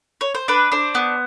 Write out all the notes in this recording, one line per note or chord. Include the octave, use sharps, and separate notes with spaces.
C#5
C5
D4 B4
D4 C5
B3